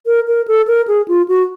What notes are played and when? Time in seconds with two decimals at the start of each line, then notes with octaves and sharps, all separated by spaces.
0.06 A#4
0.28 A#4
0.48 A4
0.68 A#4
0.88 G#4
1.08 F4
1.28 F#4